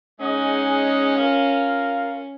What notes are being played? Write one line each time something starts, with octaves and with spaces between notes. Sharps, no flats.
G#3 C#4 D#4 G#4 D#5 F#5
F4 A#4 F5